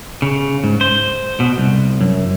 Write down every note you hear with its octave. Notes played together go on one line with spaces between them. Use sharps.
C#3
G#2
C5
B2
C2
F#2